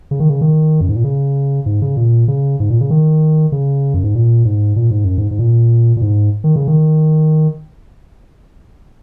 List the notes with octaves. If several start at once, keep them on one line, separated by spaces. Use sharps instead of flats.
C#3
D#3
C#3
D#3
F#2
G#2
A#2
C#3
G#2
C#3
A#2
C#3
G#2
A#2
C#3
D#3
C#3
F#2
G#2
A#2
G#2
A#2
G#2
F#2
G#2
G#2
A#2
A#2
G#2
D#3
C#3
D#3